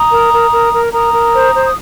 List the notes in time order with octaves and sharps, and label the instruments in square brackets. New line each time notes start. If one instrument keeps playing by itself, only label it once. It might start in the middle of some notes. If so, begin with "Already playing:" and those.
Already playing: [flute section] A#5 D#6
A#4
A#4
A#4
A#4
A#4 A#5 D#6
A#4
C5
C5
D#6